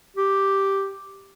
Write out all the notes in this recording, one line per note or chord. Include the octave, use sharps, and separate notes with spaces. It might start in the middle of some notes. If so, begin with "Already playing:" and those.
G4